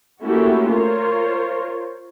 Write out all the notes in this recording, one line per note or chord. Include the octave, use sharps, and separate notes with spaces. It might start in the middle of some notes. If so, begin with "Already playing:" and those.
A3 A#3 C#4 E4 F#4 G4
F4 A#4 C5 C#5